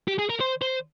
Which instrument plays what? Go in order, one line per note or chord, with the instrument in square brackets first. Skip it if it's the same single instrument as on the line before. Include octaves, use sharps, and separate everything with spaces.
[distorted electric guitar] G4
G#4
A#4
C5
C5